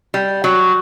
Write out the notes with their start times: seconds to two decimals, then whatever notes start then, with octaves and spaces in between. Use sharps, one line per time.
0.14 G3
0.44 F#3